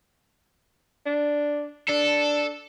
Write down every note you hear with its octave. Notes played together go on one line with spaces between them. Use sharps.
D4
D4 A4